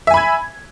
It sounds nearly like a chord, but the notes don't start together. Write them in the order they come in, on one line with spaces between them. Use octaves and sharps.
E5 G#5 B5 G#6